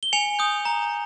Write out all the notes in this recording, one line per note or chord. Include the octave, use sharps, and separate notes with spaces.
G7
G#5 C#7 F7
D#6 G6
A#5